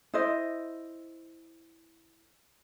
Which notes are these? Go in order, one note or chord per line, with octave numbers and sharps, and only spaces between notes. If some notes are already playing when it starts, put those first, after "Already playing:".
E4 C5 D#5